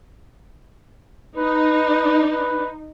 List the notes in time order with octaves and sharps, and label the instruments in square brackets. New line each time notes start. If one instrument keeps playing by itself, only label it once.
[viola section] D#4 [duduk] B4
[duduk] B4